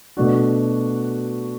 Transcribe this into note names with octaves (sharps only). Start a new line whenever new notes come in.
B2 A3 D4 F#4